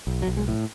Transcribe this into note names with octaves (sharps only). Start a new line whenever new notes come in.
B1
F#3
B1
G#3
A2